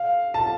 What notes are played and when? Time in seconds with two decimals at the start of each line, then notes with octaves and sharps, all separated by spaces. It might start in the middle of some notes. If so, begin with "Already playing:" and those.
Already playing: F5
0.34 A5